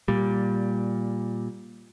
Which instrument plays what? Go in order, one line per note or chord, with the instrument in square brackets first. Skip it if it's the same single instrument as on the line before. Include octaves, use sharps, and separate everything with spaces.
[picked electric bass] A#2 G3